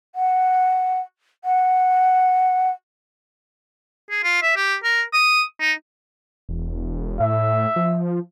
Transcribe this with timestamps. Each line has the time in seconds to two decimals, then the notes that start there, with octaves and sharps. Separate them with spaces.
0.15 F#5
1.44 F#5
4.10 G#4
4.24 F4
4.43 E5
4.56 G4
4.84 A#4
5.13 D#6
5.60 D#4
6.49 E1
7.20 A2 E5
7.76 F3